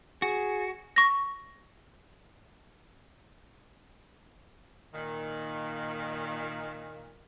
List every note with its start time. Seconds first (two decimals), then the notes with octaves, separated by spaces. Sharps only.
0.22 F#4 G#4
0.96 C#6 A#6
4.94 A#2 D#3